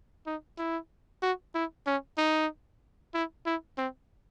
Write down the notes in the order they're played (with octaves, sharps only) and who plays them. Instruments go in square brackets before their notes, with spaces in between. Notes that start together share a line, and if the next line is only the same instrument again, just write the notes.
[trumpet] D#4
E4
F#4
E4
C#4
D#4
E4
E4
C4